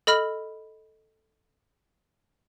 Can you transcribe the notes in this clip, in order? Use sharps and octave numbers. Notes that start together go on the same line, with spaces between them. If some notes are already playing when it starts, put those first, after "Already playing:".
A4 D#5 B5 F6